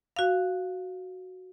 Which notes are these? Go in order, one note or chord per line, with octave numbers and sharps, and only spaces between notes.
F#4 F5